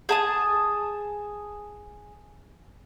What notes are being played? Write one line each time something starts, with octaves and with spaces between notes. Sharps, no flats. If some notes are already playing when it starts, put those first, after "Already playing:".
G#4 A5 D#6